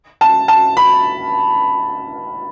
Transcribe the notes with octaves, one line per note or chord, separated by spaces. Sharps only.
A5
A5
B5